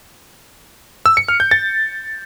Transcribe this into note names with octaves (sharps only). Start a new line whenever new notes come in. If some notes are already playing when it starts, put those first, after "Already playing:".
E6
C#7
F6
G6
A6